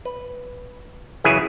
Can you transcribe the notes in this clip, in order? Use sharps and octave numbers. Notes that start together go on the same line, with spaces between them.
B4
F#2 C#3 E3 E4 G#4